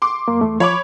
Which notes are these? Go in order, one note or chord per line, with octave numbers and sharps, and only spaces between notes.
C6 D6
F#2 A#3
E2 A3
F3 C#5 B5 D6